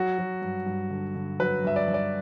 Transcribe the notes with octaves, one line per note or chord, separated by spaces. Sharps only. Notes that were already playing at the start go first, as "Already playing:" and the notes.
Already playing: F#3 F#4
F#3
G2
G2
D3
D3
F#3 B4
G2 E5
D5
G2
D5